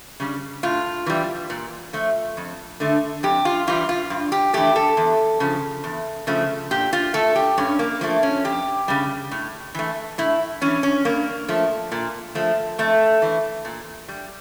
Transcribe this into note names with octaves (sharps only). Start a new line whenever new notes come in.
C#3 G3
A2 F4
E3 G3
A#2
F3 A3
F2
D3 A3
F2 G4
F4
E3 G3 F4
F4
G2
G4
E3 A3 G4
A4
E2
C#3 F3
E2
C#3 F3 A3
A#2 G4
F4
A3 A4
G4
G2 C#4
A#3
F3 A3 A#3
C#4
F2 G4
C#3 G3
A2
E3 A3
A2 E4
E3 G3 C#4
C#4
G2 A#3
F3 A3
A#2
F3 A3
F2 A3
E3 A3
A#2
G3